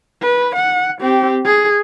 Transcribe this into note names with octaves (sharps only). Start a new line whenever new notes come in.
B4
F#5
C4 G4
G#4